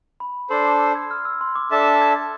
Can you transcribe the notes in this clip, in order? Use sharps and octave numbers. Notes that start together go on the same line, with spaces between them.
B5
D4 A4 C5 C6
D6
E6
G#6
F6
E6
C6
D6
D4 A4 E5 A5 D6
E6
G#6
A6